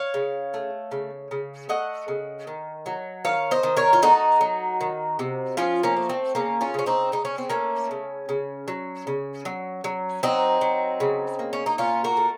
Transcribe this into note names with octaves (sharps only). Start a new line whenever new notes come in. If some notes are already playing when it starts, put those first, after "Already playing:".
Already playing: C#5 F5
C#3
A3
C#3
C#3
A3 D#5 F#5
C#3
D#3
F#3
D#3 C#5 F5
C5 D#5
D#3
A#4 C#5
F4
A3 D#4 F#4
F#3
D#3
C3
F3 C#4 F4
A#3 C#4
A3
C4
C#3 A#3 C#4
C#4 F4
C#3 C#4
C4 D#4
C#3 D#4
C#4
C4
A3 A#3 C#4
C#3
C#3
F#3
C#3
F#3
F#3
F#3 C4 D#4
F#3
C#3
A#3
C#4
D#4
A#2 C#4 F4
F#4 A#4
A3